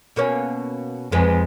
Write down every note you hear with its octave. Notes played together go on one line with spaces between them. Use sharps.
B2 A#3 C#4
F2 G#3 B4